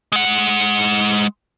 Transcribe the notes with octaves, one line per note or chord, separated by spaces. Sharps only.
G#3 F#5